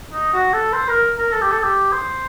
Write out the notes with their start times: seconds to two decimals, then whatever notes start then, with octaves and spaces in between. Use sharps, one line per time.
0.13 D#4
0.34 F#4
0.53 A4
0.73 C5
0.88 A#4
1.18 A#4
1.32 A4
1.41 G4
1.51 A4
1.63 G4
1.92 C5